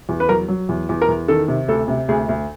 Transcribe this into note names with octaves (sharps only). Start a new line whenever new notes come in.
E2
B4
F#3 A#4
F#3
E2
E2
A#4
E2
D#3 A4
C3
D2 A4
C3
D2 G#4
D2